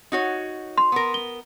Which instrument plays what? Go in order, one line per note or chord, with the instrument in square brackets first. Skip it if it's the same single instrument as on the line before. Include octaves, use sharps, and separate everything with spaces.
[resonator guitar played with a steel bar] D#4 F#4 C#5
[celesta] C6
[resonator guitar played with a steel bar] B3 A#4
[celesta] G7